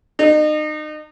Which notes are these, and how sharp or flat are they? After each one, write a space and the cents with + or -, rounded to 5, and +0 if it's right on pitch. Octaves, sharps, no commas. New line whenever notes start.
D#4 -35